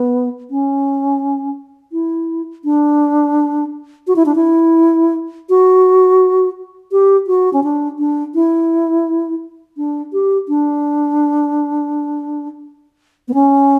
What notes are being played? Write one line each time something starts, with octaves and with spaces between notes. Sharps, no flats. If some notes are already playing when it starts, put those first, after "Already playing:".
Already playing: B3
C#4
E4
D4
F#4
E4
D4
E4
F#4
G4
F#4
C#4
D4
D4
E4
D4
G4
D4
B3
C#4